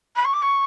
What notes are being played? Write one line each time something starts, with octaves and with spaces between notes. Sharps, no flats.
B5
C#6
D6
C#6